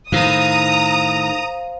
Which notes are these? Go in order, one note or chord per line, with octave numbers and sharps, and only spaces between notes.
A2 D#3 C5 F5 A#5 D#6